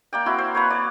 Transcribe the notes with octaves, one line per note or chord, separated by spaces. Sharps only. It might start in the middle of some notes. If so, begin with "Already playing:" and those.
A#3 D5 G5
C4 E4 F#4
C5
A#3 B4 C#5
D5